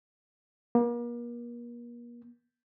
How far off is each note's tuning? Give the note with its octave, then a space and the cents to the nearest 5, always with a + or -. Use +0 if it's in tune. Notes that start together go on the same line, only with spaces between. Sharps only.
A#3 +40